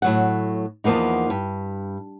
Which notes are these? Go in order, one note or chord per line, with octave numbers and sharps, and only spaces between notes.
A2 F#3 F#5
E2 F3 A#3 B3 D#4
G2